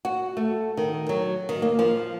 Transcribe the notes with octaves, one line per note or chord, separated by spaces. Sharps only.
F#4
A3
D#3
F#3
D#3
A#3
F3